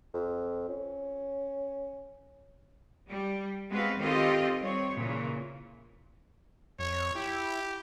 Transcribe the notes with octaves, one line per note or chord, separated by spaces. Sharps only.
F2
C#4
G3
G#3 B3 C4 F#4 B4 F5
D#3 C4 F4 G4 A4 D#5
G3 C4 C#5
A#2 C#3 E3
F2 C#5
E4 G4